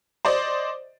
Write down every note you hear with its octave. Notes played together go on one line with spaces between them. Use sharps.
C5 D5 D#5